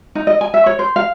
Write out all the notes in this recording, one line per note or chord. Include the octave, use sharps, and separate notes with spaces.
D#4
D#5
G#5
E5
C#5
C5
F5